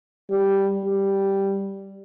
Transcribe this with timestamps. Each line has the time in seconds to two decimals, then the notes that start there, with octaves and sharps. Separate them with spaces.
0.30 G3
0.84 G3